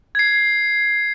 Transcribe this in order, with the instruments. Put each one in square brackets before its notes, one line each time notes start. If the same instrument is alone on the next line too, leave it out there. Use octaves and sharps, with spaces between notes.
[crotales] G#6 C7